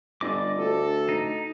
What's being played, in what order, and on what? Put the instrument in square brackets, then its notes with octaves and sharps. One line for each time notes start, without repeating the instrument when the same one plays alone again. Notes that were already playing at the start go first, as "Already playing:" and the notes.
[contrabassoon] G1 [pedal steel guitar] D5 D#5 D6
[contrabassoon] D2 [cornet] A4
[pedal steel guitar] D#4